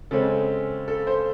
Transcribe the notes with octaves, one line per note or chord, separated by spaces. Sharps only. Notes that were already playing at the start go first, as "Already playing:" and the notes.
C#3 G#3 C4 A4
A4
C5